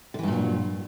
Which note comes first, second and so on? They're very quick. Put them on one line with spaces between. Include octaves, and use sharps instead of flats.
D3 E3 G2 A#2 F#3